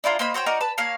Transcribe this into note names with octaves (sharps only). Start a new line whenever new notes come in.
D4 E4 F4 A#4
A#3 C5 D#5 B5
F#4 C5 C#5 G5
D#4 F#4 A#4 D5
B4 A5 B5
A#3 C#5 F5